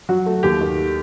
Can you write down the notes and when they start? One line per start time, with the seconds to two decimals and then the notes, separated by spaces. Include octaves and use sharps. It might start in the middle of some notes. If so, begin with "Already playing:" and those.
0.09 F#3 F#4
0.26 A3
0.43 D#2 G4
0.61 D#3